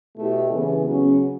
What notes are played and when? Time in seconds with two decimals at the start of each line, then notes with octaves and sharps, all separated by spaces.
0.17 B2 A3 E4 G4
0.51 C#3 E3 B3
0.86 C#3 F#3 C#4